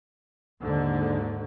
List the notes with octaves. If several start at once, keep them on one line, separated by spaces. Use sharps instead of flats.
D#2 G#2 D3